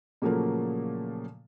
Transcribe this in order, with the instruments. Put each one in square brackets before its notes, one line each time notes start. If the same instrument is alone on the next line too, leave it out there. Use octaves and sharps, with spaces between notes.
[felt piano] A#2 C#3 F3 F#3 A3 A#3